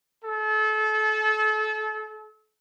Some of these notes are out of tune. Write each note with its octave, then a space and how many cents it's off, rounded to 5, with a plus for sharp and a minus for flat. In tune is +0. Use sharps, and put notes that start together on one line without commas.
A4 -30